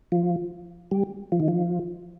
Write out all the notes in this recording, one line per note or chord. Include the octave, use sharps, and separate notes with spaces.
F3
G3
F3
D#3
F3